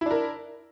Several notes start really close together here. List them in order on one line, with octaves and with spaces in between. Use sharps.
E4 D4 A#4